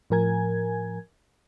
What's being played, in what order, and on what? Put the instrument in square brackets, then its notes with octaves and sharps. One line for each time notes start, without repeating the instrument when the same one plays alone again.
[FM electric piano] A2 F3 A#4 G#5 G#6